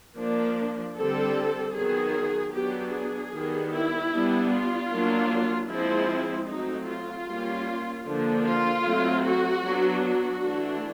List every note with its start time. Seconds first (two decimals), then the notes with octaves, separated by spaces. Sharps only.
0.17 F3 A#3 D4
0.97 D3 G3 C4 A4
1.75 D#3 F#3 B3 G#4
2.54 F#3 B3 D4 G4
2.94 G#4
3.33 D#3 G3 B3
3.73 E4
4.12 G3 B3 D4
4.52 F4
4.91 F#3 A#3 D4
5.69 F3 G#3 C4 E4
6.48 F#3 A3 C4 D#4
6.88 F4
7.27 G3 A#3 C#4
8.07 D3 F3 A#3 D4
8.46 F4
8.85 F#3 A3 C4
9.25 F#4
9.64 F#3 B3 D4
10.04 F#4
10.43 E3 A3 D4